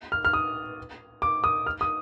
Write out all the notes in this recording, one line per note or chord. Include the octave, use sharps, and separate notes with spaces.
F6
F6
D#6
D6
D#6
F6
D#6